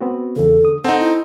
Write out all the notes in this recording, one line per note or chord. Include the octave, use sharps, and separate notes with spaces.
B3 C4 F#4
E2 C#3 A4
D3 D#6
C4 D#4 A4 F#5 A5
E4